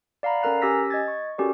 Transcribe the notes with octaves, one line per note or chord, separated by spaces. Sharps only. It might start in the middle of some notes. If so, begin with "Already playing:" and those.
D5 F5 F#5 A#5 B5
C#4 A4 A#4 A#5 F#6 C7
C#4 G4 G#5 E6 A#6 B6
D#5 G#6 A6
C#6
C#4 F#4 G4 A4 A#4 D5